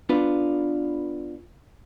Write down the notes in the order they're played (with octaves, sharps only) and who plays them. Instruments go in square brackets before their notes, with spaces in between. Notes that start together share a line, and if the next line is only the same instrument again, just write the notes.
[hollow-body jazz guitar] B3 D4 F4 B4